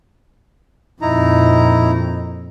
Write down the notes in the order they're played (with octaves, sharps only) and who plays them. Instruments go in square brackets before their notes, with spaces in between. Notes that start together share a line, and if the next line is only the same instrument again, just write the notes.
[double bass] F2 A#2 [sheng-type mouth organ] D#4 E4 A#5